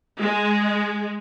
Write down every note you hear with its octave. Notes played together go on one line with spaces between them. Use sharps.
G#3